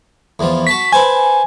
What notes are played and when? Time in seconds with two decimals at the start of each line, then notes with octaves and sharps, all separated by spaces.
0.39 E2 E3 F3
0.67 F#4 A5 C#6 B6
0.92 B4 C5 G#5 A5